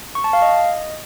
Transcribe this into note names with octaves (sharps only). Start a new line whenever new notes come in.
C#6
A5
F5
D#5